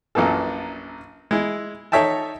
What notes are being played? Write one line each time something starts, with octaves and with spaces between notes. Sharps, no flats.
A#1 F#2 A#2 E3 A4
G#3 E4
D#4 A4 C#5 E5 G5 A5